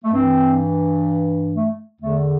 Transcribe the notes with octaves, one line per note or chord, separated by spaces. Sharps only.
A3
G2 E3 C4
A3
E2 D3 A3